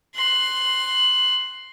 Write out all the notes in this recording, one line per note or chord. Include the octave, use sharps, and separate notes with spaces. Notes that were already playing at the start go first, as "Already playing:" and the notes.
C6 F#6